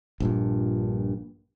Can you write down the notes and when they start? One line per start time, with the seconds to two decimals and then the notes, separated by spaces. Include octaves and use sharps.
0.20 A#1 G2 A#2